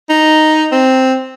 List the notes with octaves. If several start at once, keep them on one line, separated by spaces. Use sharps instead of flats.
D#4
C4